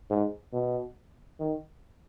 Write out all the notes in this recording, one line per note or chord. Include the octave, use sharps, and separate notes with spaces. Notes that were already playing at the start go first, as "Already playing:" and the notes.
G#2
B2
D#3